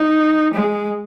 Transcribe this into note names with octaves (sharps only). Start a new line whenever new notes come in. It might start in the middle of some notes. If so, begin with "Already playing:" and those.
Already playing: D#4
G#3